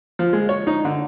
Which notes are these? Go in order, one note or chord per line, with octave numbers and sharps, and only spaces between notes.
F3
G#3
C#5
D#4
D3